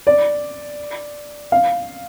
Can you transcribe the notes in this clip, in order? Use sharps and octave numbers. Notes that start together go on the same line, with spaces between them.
D5
F5